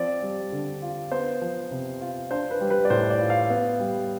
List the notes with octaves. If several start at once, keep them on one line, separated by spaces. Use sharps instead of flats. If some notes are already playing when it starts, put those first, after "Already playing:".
Already playing: F3 C4 D5
G3
D3
F4
B3 C5
F3
C3
F4
D4 C5
B4
G3
B4
D5
A2 C5
D5
F4
F5
B3
G3